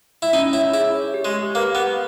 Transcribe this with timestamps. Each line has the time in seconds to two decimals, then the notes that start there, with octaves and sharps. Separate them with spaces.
0.22 E4
0.33 C#4 D#4
0.53 E4 C#5
0.73 E4 G#4
0.94 C#5
1.14 G4
1.25 G#3
1.34 G4
1.55 A#3 B4
1.75 B3 B4